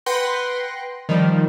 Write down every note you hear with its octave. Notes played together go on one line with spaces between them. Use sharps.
B4 F#5 G5 C6 F#6 A#6
D#3 F3 G3